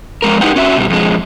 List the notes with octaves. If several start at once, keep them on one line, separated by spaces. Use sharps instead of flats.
F2 B2 G#3 A#4
D#4 E4 G4 B4 F#5 G5
C#4 F#4 E5
B2 G3
F2 G#3